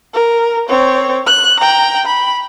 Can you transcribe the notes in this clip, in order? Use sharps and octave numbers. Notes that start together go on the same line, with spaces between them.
A#4
C4 C#5
F#6
G5 A#5
B5